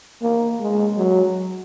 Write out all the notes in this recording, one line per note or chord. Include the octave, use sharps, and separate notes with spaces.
A#3
G#3
F#3